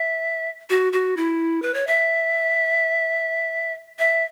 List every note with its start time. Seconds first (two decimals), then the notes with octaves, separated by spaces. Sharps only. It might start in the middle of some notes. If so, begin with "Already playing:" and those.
Already playing: E5
0.70 F#4
0.93 F#4
1.17 E4
1.62 B4
1.74 C#5
1.87 E5
3.99 E5